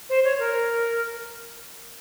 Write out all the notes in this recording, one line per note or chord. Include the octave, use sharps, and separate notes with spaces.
C5
C#5
A#4